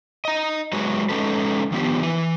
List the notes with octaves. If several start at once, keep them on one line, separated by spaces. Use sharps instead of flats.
D#5 A#5
F#3 G#3 F#4 B4
G#3 C#4 D#4 A4 B4
D#3 F3 B3 G4
E3 B4